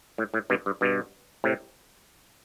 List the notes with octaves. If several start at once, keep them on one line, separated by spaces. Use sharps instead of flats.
A2
A2
G2 B2
G2
G2 B2
A2 C3